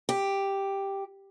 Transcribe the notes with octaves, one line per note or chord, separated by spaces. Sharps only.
G4